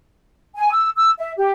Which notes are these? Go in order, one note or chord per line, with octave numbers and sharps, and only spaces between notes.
G#5
E6
E6
E5
G4